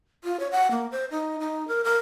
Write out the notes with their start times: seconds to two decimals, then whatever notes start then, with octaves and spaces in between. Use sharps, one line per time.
0.24 F4
0.40 C#5
0.52 F#5
0.71 A#3
0.91 C5
1.11 D#4
1.40 D#4
1.68 A#4
1.84 A#4